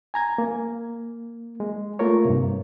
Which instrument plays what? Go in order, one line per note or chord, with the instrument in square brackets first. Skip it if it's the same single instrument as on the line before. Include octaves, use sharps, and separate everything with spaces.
[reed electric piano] G#5 A#5 G#6
A#3
G#3
A3 A#3 F4 A#4 C#5
G2 C3